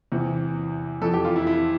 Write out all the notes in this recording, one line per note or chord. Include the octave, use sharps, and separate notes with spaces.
E2 C3 E3
F2 E3 A4
G4
F4
E4
E4